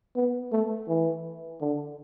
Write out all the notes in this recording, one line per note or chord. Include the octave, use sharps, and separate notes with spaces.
B3
A3
E3
D3